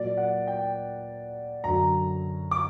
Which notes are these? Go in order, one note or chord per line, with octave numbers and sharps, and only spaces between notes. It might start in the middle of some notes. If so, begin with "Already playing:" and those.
Already playing: A#2 F#3 D5
F#5
G5
F#2 D3 F#3 A#5
D6